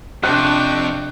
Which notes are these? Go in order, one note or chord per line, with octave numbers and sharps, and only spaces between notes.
F2 C3 D4 G5 C#6 F#6 G6